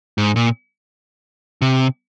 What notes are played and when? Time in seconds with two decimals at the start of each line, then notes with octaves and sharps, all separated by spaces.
0.18 G#2
0.36 A#2
1.62 C3